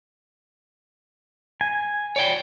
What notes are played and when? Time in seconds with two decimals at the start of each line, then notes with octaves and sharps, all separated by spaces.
1.61 G#5
2.16 C#5 D5 G5